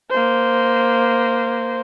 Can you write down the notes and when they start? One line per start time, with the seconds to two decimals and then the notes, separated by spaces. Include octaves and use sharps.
0.10 A#3 C5